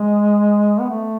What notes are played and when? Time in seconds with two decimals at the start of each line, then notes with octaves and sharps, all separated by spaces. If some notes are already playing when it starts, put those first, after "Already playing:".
Already playing: G#3
0.80 B3
0.90 A3